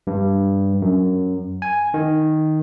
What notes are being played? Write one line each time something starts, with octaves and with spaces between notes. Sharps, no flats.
G2
F#2
G#5
D#3